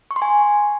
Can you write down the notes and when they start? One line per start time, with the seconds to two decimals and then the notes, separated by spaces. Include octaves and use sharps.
0.11 C#6
0.16 C6
0.22 G#5